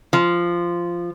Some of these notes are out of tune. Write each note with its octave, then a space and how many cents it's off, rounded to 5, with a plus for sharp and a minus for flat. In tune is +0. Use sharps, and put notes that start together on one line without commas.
F3 -10